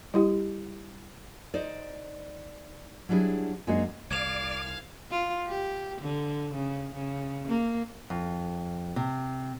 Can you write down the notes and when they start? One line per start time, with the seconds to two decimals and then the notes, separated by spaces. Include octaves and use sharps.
0.14 G3 E4 G4
1.54 D#4 C5 D5
3.09 F#3 G3 D4 E4 G#4
3.67 F#2 G#3 A#3 D4 F#4 D#5
4.11 C2 D5 F5 G#6 E7 F7
5.11 F4
5.47 G4
6.01 D3
6.54 C#3
6.94 C#3
7.48 A#3
8.10 F2
8.96 C3